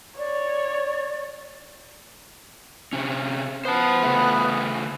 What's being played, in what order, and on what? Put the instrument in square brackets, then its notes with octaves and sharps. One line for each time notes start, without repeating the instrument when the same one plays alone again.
[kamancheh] C#5 [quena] D5
[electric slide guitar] C3 C#4
[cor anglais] B3 [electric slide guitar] C5 A5
[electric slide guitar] C#3 A3